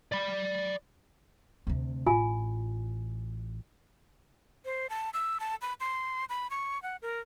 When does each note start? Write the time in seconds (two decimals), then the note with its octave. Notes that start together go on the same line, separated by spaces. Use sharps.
0.12 D5 B5
1.67 D2 C3
2.06 A1 F4 G#5
4.65 C5
4.90 A5
5.14 E6
5.40 A5
5.62 B5
5.80 C6
6.29 B5
6.50 C#6
6.83 F#5
7.02 A#4